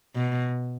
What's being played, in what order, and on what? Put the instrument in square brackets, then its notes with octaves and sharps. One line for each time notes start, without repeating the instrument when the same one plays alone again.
[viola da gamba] B2